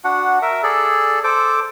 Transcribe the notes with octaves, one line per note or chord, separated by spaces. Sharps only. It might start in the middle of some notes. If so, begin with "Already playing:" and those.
D4 F#4 F#5
A#4 E5
G#4 A4 D5
A4 C5 D6